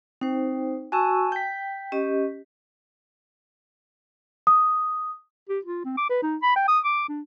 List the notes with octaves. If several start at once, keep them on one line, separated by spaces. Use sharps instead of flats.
C4 D#4 C5
F#4 G#5 A5 C#6 E6
G5 G6 B6
C#4 G4 D#5
D#6
G4
F4
C4
D6
B4
D#4
B5
G5
D#6
D6
D4